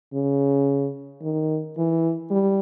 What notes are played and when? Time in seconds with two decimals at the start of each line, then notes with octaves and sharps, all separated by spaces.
0.13 C#3
1.22 D#3
1.78 E3
2.31 G3